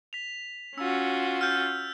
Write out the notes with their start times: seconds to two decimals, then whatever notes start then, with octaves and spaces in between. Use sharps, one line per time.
0.13 B6 F7
0.78 C#4 F4 F#4 E6
1.41 F6 G6 A6